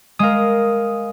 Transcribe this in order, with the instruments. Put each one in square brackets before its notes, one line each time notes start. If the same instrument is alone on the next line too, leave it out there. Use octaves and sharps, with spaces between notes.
[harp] G#3 A#4 [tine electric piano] F5 D#6